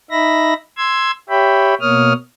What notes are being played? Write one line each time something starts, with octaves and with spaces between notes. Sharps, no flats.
D#4 E5 B5 A#6
C6 E6 G#6
G4 C#5 E5 G5 B5
B2 A#3 C#5 D#6 F6